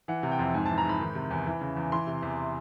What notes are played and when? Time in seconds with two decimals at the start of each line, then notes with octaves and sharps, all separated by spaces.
0.08 E3 F#5
0.23 C3
0.31 G5
0.39 F2
0.54 G#2 G#5
0.66 E3 A5
0.78 A#5
0.85 G#2 B5
1.00 D#3
1.15 C3
1.31 E2
1.46 E3
1.61 C#3
1.77 E2
1.92 E3 C6
2.07 C3
2.23 E2